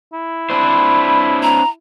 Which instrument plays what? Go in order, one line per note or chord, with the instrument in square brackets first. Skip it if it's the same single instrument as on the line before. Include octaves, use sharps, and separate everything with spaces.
[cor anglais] E4
[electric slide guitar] C4 D4 C5 [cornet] B5
[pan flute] A#5